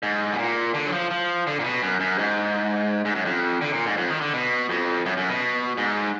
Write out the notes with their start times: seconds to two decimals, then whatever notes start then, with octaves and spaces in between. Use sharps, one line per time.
0.03 G#2
0.33 B2
0.39 A#2
0.74 D3
0.87 F#3
0.92 F3
1.11 F3
1.47 D3
1.59 A#2
1.64 B2
1.82 F#2
2.00 F#2
2.19 G#2
3.05 G#2
3.15 F#2
3.25 F2
3.61 D3
3.73 A#2
3.86 G#2
3.97 F2
4.10 D#3
4.21 D3
4.33 B2
4.70 F2
5.06 F#2
5.17 F#2
5.29 B2
5.78 G#2